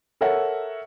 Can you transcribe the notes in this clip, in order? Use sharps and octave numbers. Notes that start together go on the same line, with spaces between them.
A4 A#4 C#5 E5 F#5